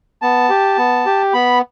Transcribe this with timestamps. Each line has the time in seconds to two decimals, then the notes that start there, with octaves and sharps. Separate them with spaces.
0.22 B3 A5
0.50 G4
0.78 B3
1.06 G4
1.33 B3 B5